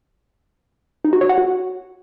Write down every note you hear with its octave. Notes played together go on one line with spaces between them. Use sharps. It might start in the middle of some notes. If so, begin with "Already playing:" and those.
D#4
F#4
C#5
F#5
F#4